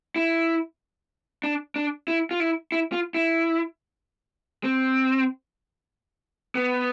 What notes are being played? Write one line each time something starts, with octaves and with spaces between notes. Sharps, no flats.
E4
D4
D4
E4
F4
E4
E4
F4
E4
C4
B3